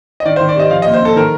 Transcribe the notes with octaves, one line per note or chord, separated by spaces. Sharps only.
D#5
D#3 D5
C5
D#3
D5
C3 D#5
F3 F5
D#5
A#2
C5
C4 A4
D#3 A#4